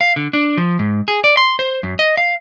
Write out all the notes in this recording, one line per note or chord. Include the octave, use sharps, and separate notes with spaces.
F5
D3
D4
F3
G#2
G#4
D5
C6
C5
F#2
D#5
F5